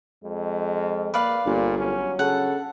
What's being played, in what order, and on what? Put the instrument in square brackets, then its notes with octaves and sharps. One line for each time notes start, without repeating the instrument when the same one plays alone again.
[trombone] F2 [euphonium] G#3
[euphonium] A#3 [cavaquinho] B4 D5 F5
[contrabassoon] G1 [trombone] A#2 [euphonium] A#3
[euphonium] F#3 [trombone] C#4
[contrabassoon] C#3 [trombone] A4 [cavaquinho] F#5